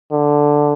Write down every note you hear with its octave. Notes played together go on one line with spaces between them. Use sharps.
D3